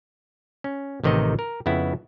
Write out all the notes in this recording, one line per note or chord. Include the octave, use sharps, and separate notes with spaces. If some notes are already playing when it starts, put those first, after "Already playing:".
C#4
A1 C3 D#3 D#4 D#5
A#4
F2 C#3 B3 E4